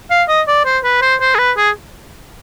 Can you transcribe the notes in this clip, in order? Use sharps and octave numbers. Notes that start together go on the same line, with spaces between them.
F5
D#5
D5
C5
B4
C5
C5
G#4
B4
G#4